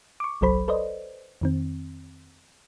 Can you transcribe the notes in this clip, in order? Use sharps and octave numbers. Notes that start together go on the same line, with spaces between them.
C#6 D6
G1 C2 F#3 A4 C5 B5
A4 B4 C5 D5 D#5
F2 D#3 C4